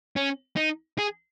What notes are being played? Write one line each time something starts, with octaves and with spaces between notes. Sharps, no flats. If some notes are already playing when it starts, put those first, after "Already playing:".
C#4
D#4
G#4